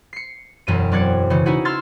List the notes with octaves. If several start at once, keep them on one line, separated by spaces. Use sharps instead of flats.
C7 C#7
E1 F#2 D#7
F#3 C4 D5 F#6 G#6 C#7
C#3 E3 C#4
C#4 D#4 E4 F#4 G#4
C6 E6 F6 G#6 A6